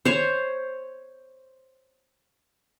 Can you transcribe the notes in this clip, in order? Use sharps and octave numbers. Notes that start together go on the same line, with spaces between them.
C5 C#5